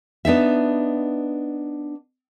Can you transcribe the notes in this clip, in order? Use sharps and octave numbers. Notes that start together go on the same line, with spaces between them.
B3 D4 D#4 E5